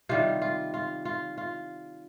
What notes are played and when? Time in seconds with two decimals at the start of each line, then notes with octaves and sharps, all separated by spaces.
0.09 C3 D#3 G3 F4
0.42 F4
0.74 F4
1.05 F4
1.38 F4